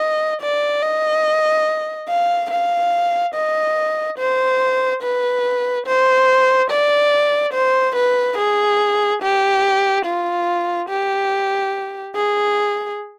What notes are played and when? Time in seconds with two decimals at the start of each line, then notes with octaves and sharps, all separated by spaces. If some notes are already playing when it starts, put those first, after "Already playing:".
Already playing: D#5
0.42 D5
0.83 D#5
2.08 F5
2.51 F5
3.35 D#5
4.18 C5
5.03 B4
5.87 C5
6.71 D5
7.54 C5
7.95 B4
8.38 G#4
9.22 G4
10.06 F4
10.89 G4
12.16 G#4